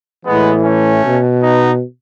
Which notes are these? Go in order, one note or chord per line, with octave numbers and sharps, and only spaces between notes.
A2 E3 G#3 B3
A3 C#4
B2
B3 D#4